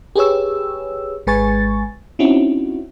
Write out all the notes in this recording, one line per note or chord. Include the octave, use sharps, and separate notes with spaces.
G4 G#4 B4 C#5 E6
G#1 G#3 B4 G#5 C#6 A6
C4 C#4 D#4 E4 F#4